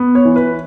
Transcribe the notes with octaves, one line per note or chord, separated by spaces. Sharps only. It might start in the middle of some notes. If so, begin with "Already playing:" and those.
Already playing: B3
C#5
E3
B4